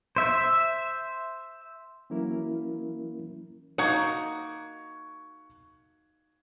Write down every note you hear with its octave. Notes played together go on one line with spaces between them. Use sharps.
C5 E5
E3 F#3 A#3 C#4 E4 A#4
A#3 D#4 F#4 C#6 G#6 C#7